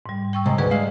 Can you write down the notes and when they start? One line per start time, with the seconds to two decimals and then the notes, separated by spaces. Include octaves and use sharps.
0.06 G#2 G3
0.33 G5 C#6 E6
0.46 C3 G#3
0.58 D2 G#4 B4 D5
0.71 G#3 F5